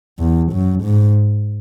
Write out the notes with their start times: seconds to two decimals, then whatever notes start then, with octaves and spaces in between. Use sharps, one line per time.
0.20 E2
0.52 F#2
0.84 G#2